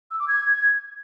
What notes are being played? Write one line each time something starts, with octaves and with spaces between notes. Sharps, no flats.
E6
D6
G#6